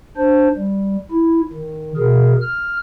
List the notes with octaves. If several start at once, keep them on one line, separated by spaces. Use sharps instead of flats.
D4 C5
G3
E4
D#3
B2 G#4 A#4
F6